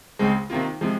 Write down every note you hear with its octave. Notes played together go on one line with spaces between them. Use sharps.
C#2 C#3 G#3 C4
C3 D#3 A#3 F4
C3 F3 G#3